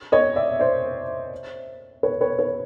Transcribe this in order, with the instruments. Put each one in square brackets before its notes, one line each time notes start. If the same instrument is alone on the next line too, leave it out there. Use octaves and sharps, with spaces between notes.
[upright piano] C#5 D#5
D5 E5
C5 D5
B4 C#5
B4 C#5
B4 C#5